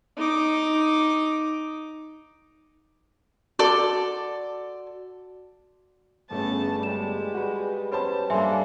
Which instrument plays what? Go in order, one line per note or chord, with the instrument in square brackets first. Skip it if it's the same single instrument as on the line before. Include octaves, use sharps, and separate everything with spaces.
[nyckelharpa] D#4 D6
[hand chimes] F#4 [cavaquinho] A4 D5 D6
[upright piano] G1 A3 B3 [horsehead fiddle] C#4 G#4 [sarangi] A5
[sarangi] G3 [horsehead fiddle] G#3 [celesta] E7
[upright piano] F#4 B4
[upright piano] C#4 C5 A5 [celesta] B4 B5
[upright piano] G2 [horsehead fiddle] A#3 A4 [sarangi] D4 [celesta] E5 G#5 C6